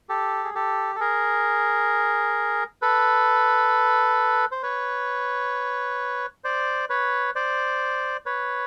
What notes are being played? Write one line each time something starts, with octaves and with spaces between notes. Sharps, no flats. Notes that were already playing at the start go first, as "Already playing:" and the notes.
G4 A4
G#4
G4 A4
A4
G#4 A#4
A4 B4
C5
B4 C#5
C5 D5
B4 C#5
C5 D5
B4 C#5